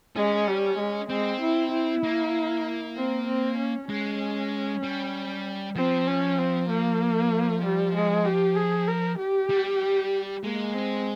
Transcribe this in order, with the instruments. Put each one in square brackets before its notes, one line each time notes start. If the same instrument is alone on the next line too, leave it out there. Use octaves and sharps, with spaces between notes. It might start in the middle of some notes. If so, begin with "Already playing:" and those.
[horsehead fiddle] G#3 [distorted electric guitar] C#4
[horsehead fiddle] G3
G#3
[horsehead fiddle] G#3 [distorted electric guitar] C4
[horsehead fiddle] E4
E4
[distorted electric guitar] A#3
[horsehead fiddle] C4
C4
C#4
[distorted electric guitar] G#3 [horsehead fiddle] C#4
[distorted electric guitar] G3
[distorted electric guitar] F3 [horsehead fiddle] C4
[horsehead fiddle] C#4
C4
A#3
G3
G#3
G4
G#4
A#4
G4
[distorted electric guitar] G3
[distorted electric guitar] G#3 [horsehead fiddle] A#3
[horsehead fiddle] C4